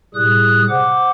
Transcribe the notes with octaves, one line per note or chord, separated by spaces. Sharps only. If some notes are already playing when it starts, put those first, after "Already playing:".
A2 C3 G3 G#4 D#6 F#6
C5 F#5 D6